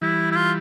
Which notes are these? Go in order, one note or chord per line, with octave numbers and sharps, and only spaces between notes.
E3 G3 E4
E4
F4